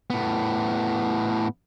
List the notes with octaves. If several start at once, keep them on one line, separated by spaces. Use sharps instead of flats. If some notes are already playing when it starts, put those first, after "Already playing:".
A2 B3